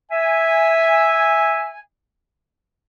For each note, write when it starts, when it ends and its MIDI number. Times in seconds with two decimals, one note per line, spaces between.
0.11 1.79 76
0.11 1.79 80